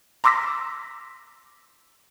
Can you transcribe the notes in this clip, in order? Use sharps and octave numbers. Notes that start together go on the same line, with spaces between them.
A#5 C6 D6 E6 A#6 B6